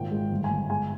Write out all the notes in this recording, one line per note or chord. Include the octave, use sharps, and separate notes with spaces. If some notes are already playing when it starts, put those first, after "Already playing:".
Already playing: G#1 A#2 G5
G#3
G1
G#5
G1
G#3 G#5